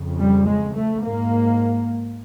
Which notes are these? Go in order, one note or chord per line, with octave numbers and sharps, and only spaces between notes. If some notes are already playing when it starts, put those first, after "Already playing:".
Already playing: F2 C#3
G3
G#3
A3
G#2 A#3